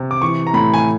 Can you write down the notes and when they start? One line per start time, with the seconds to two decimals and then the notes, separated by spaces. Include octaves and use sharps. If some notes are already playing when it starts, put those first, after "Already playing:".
Already playing: C3
0.11 D6
0.22 E3 C#6
0.47 A#5
0.54 A2 B5
0.74 G#5